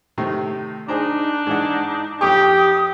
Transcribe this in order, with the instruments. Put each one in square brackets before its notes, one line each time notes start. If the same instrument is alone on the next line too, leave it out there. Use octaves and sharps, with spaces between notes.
[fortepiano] A2 C3 D#3
[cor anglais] D4 [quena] D#4 [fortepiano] G#4 C5 A#5
[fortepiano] G#2 E3 F#5 [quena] D#4
[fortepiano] F2 C#6 [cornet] G4 [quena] D#6